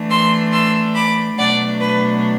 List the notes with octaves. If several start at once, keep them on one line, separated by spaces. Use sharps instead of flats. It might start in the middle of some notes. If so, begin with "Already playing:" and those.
Already playing: E3 A3 D4
C6 E6
C6 E6
B5 D6
B2 F#3 A3 D4 D5 F#5
B4